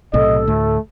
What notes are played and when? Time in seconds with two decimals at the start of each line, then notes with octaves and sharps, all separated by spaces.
0.13 B1 A2 C3 A4 D#5
0.48 D2 A2 A3